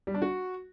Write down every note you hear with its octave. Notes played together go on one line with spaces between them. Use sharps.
G3
D4
F#4